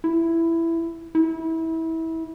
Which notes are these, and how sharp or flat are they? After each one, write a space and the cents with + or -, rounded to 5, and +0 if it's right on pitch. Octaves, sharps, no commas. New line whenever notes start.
E4 +10
E4 -25